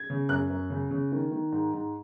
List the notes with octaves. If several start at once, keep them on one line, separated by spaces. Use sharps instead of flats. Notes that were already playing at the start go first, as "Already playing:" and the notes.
Already playing: G#6
C#3
F#2 F#6
F#2
C#3
C#3
D#3
D#3
G#2
G#2